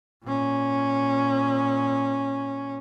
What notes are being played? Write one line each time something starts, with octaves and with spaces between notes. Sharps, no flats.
A#2 C#4